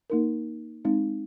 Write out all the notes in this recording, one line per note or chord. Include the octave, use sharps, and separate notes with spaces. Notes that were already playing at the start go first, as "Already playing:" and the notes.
A#3 D#4 A#4
G#3 C4 D#4